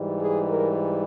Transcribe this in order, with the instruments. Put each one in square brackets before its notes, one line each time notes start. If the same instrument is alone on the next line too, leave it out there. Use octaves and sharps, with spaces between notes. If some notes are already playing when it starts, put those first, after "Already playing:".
Already playing: [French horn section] G#2 E3 G3
G#4
A#4